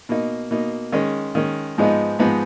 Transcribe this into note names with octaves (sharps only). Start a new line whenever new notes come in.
B2 A#3 D#4
B2 A#3 D#4
D#3 G#3 C#4
D#3 G#3 C#4
G#2 F3 G#3 B3 D#4
G#2 F3 G#3 B3 D#4